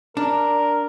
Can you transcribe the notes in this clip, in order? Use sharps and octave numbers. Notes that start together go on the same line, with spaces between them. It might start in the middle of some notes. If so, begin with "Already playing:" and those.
D4 A#4